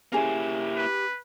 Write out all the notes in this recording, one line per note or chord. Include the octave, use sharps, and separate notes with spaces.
A#3 C#4 E4 G4 G#4
B4